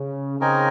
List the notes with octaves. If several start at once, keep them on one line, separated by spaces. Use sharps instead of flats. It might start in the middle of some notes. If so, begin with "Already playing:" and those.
Already playing: C#3
C#3 C4 D#4 A#4 D#5 G#5